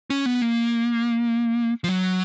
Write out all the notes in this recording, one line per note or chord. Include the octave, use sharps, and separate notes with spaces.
C#4
B3
A#3
F3
F#3